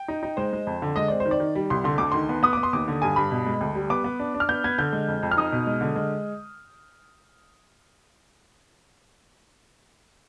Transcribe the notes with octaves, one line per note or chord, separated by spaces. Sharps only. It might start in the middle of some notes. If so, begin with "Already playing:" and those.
Already playing: G5
D#4
D#4
G#3 C5
G#3
F2
D3
G#3 D#5
C4 D5
C5
D#3
D5
D#3
G3
C2 C6
D3 C6
D2 D6
D#3 C6
B3
B3 D#6
B3 D6
C6
D#2 D6
D3
G2 G#5
G2 B5
B2
G#3
D2
G3
B3 D6
B3
D4
D4
F6
B3 G6
B3 G#6
D3 G6
G#3
F2
F2
F6
D#4 D#6
B2
G#3
D3
G#3